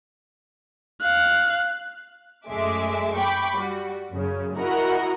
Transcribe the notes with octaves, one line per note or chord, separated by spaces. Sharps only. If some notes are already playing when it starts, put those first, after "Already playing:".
F5 F#6
F#2 G#3 A3 E5 D6
G5 B5 C#6 D6
G3 F#4
F#2 C#3
E4 F#4 A#4 D#5 F#5 A#5